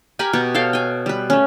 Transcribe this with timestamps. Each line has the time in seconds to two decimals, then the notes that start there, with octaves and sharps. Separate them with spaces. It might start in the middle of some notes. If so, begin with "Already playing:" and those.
0.19 G4 A#4 G#5 B5
0.33 B2 G4 C#6
0.55 A4 C#5 F5 G5
0.73 G5 G#5
1.06 G3 B4
1.30 A3 C#4